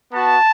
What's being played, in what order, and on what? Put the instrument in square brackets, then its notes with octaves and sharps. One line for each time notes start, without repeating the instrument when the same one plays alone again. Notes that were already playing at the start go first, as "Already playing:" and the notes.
[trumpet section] B3 F#4 A5